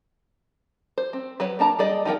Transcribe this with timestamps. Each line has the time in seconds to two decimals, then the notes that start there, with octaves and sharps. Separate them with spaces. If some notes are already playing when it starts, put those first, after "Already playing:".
0.98 C5
1.13 C4
1.40 F#3 B4 C#5
1.59 A#3 D4 A5 A#5
1.79 G3 G#4 D5 D#5
2.05 D#3 F3 B3 A#4 G5